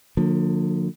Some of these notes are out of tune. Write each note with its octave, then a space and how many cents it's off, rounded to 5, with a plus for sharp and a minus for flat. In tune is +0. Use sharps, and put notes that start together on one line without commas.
D3 +15 F3 +35 A#3 -25